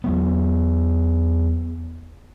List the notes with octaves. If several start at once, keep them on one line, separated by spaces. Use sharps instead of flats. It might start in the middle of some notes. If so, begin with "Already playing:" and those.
E2 F#3 B3